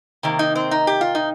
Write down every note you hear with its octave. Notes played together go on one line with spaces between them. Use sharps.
C3 D#3 A#3
D#4
C4
D#4
G4
F4
D#4